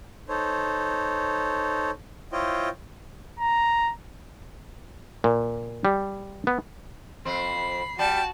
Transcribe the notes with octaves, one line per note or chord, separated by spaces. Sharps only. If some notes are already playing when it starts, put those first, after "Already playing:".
D#4 A4 C5 C#5
E4 F4 C5 C#5 D#5 G5
A#5
A#2
G3
B3
F2 C4 B5 C7
G3 F#4 G5 A5